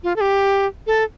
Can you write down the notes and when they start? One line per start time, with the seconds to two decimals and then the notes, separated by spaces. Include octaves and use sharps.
0.04 F4
0.16 A4
0.21 G4
0.87 A4